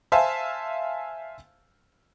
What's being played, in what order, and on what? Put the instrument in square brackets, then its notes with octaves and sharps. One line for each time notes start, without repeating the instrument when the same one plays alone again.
[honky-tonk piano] C5 E5 F5 G#5 A5